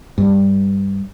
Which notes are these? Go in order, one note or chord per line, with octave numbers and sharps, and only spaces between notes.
G2